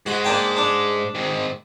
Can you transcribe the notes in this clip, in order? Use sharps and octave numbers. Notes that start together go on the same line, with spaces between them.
G#2 G#3 F#4
A#3 D4 G5
D4
G#2 D#3